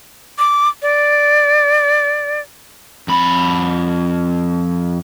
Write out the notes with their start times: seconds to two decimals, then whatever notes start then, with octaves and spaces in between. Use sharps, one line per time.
0.39 D6
0.82 D5
3.08 F2 B5